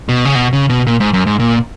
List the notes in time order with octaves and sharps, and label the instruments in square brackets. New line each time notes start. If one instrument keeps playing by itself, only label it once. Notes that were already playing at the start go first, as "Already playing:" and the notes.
[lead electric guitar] B2
C#3
B2
C#3
B2
A#2
G#2
F#2
G#2
A#2